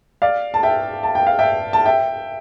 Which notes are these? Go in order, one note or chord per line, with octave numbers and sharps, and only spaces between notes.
D5 F5
A5
E5 G5
A5
G5
F5
E5 G5
A5
E5 G5